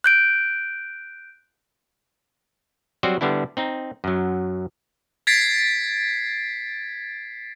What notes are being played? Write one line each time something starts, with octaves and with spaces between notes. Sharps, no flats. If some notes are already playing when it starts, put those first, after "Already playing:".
F#6 G6 D7
F#3 G3 C4 F#4 C5 D5
D3 G3 B3 D4 E4
C4 D#4
F#2 F#3
G#6 A6 B6 C7 D7